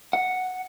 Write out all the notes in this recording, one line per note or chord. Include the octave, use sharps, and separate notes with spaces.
F#5